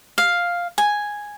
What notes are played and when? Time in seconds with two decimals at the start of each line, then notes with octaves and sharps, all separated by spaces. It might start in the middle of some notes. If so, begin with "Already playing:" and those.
0.18 F5
0.78 G#5